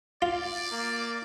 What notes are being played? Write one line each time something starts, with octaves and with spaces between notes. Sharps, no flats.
F4 D5
A#3